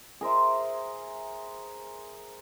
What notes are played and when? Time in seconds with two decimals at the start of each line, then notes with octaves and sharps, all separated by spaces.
0.21 G#4 A#4 C5 E5